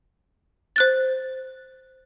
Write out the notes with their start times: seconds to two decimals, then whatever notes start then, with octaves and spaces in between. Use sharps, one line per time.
0.76 C5 F#6 A6